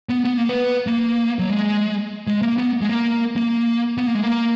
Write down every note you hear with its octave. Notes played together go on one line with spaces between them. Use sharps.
B3
B3
A#3
B3
A#3
F#3
G#3
G#3
A#3
B3
G#3
A#3
A#3
B3
A#3
G#3
A#3